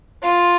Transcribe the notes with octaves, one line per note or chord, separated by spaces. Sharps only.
F4